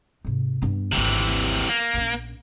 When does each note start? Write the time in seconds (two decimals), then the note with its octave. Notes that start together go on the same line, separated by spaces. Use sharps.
0.25 G#2 C3
0.62 G2 B3
0.92 G#1 D2 C3 E3
1.69 A#3
1.94 A#1 C#4